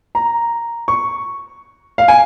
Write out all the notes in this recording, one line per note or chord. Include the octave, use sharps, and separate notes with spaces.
A#5
C#6
F5
G#5